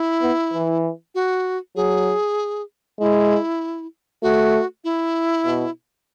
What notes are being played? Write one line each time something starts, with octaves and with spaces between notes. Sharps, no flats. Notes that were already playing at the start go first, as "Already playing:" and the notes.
Already playing: E4
B3
E3
F#4
F#3 G#4
G#3 E4
A3 F#4
E4
B2